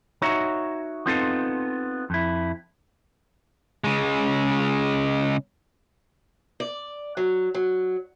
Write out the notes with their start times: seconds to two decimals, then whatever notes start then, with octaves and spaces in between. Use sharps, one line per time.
0.22 D#4 F#4 C#5 E5 A#5
1.06 B3 C4 D#4 F4 A4
2.10 F2 E4
3.84 C#3 G#3
6.60 D5
7.17 F#3
7.54 F#3